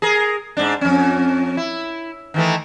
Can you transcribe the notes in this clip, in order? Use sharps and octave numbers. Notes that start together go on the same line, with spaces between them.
G#4 A#4
G#2 D4
F2 C#4
E4
D#3 E3 A3